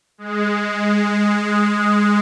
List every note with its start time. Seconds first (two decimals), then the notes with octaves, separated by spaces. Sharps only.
0.18 G#3
1.34 G#3